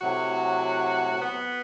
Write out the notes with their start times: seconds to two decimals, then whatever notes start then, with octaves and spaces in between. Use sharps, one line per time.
0.01 A2 C3 F#3 F#4
1.21 B3